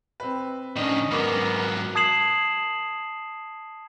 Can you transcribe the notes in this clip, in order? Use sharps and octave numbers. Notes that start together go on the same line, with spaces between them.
C4 B4
A2 D#3 C#4 D4 D#5
G#2 F#3 B3 A#4 D6 D#6
A5 D#6 G#6 C7 E7 F#7